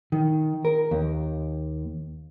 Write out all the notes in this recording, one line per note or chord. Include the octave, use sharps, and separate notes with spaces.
D#3
A#4
D#2